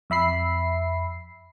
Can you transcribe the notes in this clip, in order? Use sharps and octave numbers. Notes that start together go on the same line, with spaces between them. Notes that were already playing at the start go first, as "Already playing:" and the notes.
F2 E5 B5 C7